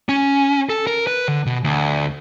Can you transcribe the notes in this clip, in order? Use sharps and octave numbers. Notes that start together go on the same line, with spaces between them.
C#4
A4
A#4
B4
D3
B2
D2